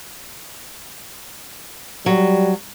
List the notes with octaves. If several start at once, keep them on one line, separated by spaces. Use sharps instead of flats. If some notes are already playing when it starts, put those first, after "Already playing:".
F#3 G3